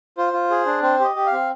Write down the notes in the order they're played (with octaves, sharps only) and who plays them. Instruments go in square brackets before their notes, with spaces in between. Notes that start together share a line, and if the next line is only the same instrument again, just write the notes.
[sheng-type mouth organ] F4 C5
F4
G#4
D4
C4 C5
G4 D#5
G4
F5
C4